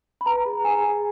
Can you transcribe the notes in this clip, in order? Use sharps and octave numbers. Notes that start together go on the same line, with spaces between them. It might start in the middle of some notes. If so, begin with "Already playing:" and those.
B5
B4 A#5
G#4
G#4 G#5
G#4